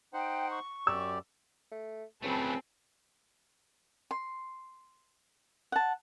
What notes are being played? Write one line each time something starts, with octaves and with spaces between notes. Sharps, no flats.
D#4 C5 F#5 G5
C#6
F#2 G4 D5 E6
A3
C#2 F#3 A3 C4 G#5 A5 B5
C6
F#5 A5